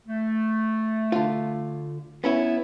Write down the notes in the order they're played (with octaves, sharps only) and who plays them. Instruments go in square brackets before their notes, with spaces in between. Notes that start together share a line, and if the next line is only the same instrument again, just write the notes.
[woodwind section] A3
[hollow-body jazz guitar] D3 F4
B3 C#4 E4